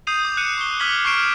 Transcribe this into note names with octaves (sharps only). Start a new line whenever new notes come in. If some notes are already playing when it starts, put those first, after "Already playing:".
D#6 G6 C7 D#7 F7
D6
F#6 C#7 D#7 E7
C#6 G7
D6 F6 G#6 B6 F#7 G7
C#6 F6 G#6 C7 D7 E7